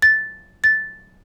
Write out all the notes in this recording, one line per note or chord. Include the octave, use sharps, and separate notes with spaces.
A6
A6